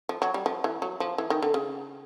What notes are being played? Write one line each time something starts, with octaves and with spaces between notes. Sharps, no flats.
F3
F#3
G3
F3
E3
F#3
F3
E3
D#3
D3
C#3